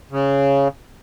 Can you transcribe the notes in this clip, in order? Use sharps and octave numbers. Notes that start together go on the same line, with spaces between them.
C#3